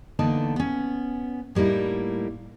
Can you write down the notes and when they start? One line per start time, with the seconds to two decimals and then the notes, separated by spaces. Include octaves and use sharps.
0.19 D3 E3 A#3 B3 D#4 A5
0.56 B3 C#4
1.55 A2 G3 A#3 D#4 E4